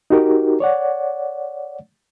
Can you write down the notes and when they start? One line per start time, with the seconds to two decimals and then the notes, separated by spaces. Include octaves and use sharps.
0.10 D#4 F#4 G4 A#4
0.60 C#5 D5 F#5